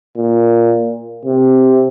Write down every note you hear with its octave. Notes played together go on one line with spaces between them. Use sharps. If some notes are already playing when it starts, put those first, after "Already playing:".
A#2
C3